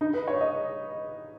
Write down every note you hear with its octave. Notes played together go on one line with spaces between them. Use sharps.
D#4
B4
C#5
D#5